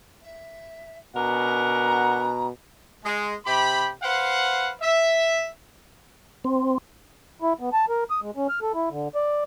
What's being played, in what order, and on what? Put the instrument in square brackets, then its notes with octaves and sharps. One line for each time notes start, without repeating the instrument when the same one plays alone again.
[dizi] E5
[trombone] B2 [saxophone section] C#4 D4 A#4 [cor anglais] F#5 [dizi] A#5
[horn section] G#3
C3 G4 G5 B5
B4 C5 F5 F#5
E5
[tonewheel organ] C4
[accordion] E4
B3
A5
A#4
D#6
G#3
C#4
F6
A4
E4
D3
D5